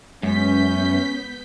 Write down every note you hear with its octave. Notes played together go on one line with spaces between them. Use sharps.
F#2 G#3 B3 C#4 G6 B6